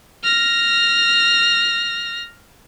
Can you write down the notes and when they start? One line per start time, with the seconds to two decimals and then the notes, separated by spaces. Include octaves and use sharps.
0.24 F6 A#6